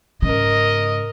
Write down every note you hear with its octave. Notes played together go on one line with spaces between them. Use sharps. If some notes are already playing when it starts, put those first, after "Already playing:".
G#2 C#3 A#4 D#5